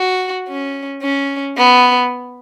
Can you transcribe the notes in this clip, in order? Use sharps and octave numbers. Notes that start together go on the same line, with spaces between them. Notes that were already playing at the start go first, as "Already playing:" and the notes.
Already playing: F#4
C#4
C#4
B3